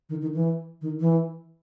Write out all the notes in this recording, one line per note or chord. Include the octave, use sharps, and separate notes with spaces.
D#3
D#3
E3
D#3
E3